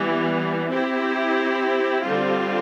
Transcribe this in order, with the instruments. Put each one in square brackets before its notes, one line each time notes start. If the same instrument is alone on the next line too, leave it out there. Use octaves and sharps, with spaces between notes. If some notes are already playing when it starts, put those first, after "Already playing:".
Already playing: [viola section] E3 G3 B3
C4 E4 G4
D3 G3 C4 F4